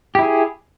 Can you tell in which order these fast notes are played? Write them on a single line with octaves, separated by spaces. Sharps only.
G4 E4 G#4